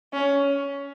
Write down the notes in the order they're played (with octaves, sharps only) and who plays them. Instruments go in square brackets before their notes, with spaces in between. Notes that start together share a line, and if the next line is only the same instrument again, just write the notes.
[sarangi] C#4